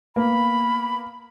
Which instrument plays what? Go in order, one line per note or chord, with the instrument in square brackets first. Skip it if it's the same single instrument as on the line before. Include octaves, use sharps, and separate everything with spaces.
[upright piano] A#3 B3 [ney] B5